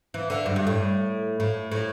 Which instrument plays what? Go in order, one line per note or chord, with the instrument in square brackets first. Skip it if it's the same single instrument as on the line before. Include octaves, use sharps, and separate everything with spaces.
[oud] E3
D3
G2
G2
A2
A2
A2